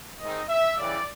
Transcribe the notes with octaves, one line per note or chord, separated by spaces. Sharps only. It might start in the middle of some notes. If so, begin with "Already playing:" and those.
G#2 D#3 G#3 C4 D#4 D#5
E5
C#3 E3 G3 D5